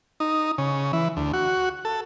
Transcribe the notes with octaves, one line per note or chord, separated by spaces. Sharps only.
D#4
C#3
E3
D2
F#4
A4